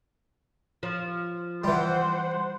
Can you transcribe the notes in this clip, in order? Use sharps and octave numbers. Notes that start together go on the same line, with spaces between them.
F3
E3 G3 C5 F#5